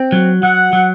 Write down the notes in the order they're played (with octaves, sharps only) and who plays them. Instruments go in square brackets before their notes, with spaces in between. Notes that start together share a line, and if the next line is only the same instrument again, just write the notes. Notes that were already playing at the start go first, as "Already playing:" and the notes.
Already playing: [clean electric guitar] C4
F#3
[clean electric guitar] F#3 [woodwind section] F#5
[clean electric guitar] F#3